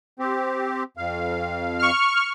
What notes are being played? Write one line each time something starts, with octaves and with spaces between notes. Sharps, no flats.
C4 G4
F2 F5
C#6 F6